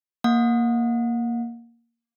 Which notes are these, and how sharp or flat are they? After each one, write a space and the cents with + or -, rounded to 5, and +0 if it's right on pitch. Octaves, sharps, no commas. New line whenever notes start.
A#3 +0 F#5 -35